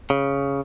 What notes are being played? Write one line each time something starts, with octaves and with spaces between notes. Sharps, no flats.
C#3